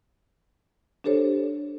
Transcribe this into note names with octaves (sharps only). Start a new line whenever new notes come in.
D4 G4 A4 C5 C#5